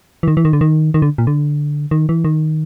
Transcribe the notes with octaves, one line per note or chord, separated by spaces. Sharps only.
E3
D#3
E3
D#3
D3
D#3
D#3
D3
A#2
D3
D#3
E3
D#3